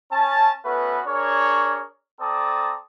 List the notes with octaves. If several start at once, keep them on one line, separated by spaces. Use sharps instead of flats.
C#4 A5
A3 B3 C#4 F#4 B4
D4 G#4 A#4 C#5
C4 A4 D5 A5 A#5 D#6